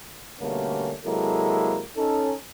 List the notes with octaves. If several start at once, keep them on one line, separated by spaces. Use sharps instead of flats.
B2 D3 G3 A3 A#3 C#4
C3 F#3 G#3 A#3 E4 A4
C#4 D#4 A4